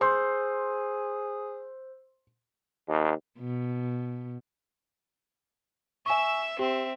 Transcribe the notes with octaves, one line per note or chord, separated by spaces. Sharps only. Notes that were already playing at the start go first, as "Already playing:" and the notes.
G#4 C5 C6 E6 G6
D#2
B2
E5 G#5 C#6 E6
C4 G4 E5